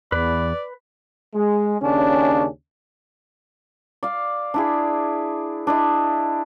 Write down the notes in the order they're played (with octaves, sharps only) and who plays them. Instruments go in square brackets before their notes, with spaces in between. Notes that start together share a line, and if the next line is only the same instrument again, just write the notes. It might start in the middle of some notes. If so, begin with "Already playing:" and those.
[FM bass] E2 [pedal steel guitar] B4 B5 [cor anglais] D5
[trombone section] G#3
D#2 C#3 C#4 D4
[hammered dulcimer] D5 F5
D4 E4 G#4
D4 E4 D#5